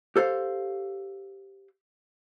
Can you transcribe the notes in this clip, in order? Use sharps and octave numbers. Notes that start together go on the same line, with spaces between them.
G4 A4 C5 F5